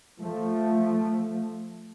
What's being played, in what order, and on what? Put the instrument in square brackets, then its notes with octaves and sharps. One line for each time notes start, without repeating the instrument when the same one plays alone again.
[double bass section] F3 A3